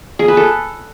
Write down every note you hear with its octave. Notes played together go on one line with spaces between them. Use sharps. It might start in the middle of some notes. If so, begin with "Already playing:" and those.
G#4
B4
A4